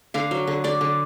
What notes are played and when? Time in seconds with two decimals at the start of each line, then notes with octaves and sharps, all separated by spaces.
0.14 D3 F5
0.31 F#3
0.47 D3
0.64 D3 D5
0.81 D3